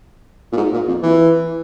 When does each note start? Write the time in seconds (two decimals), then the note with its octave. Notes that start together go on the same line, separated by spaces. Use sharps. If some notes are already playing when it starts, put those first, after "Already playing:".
0.53 A#2
0.57 G#2
0.73 A#2
0.88 F2
1.03 E3